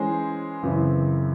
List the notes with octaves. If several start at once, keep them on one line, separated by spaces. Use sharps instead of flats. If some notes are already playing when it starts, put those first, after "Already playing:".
Already playing: E3 G#3 C#4 G#4 C5
F#2 C#3 E3 C4